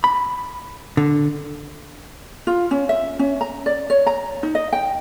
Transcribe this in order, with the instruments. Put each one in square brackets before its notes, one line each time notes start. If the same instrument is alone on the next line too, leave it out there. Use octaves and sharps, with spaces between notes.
[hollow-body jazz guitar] B5
D3
[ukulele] F4
C#4
E5
C#4
A#5
D5
C#5
A#5
D#4
D#5
G5